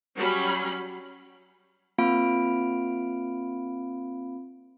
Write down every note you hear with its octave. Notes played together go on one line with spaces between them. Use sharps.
F#3 G3 C#4 B5
A#3 C4 F4 F5 B5 D7